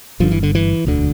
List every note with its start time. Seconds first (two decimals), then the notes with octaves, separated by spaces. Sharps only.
0.20 G1 G2 D3 F3
0.31 E3
0.43 D3
0.55 E3
0.85 E1 D2 D3